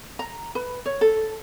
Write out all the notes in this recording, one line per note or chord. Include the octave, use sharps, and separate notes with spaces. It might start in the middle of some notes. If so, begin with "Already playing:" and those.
A#5
B4
C#5
A4